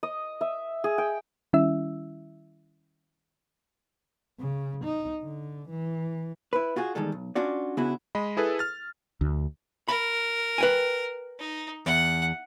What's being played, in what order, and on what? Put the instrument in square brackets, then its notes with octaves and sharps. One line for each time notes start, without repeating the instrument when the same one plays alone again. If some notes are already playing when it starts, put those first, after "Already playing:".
[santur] D#5
E5
G#4
G5
[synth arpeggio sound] D#3 G3 C#4 E4 E5 E6
[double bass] C#3
D#4
D3
E3
[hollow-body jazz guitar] E4 B4
F4 F#4 G#4
E2 D#3 G3 G#3 A4
B1
C#4 D4 F4 F#4 D5
C#3 B3 D4 E4 F#4 G#4
[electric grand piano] G#3 D#5 B5
E4 G#4 A4 B4
F6 A6
[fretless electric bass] D2
[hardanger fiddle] A#4 [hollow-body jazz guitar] B5
[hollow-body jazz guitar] B4 G5 G#5
[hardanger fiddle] D#4
[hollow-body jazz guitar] E2 [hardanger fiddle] F#5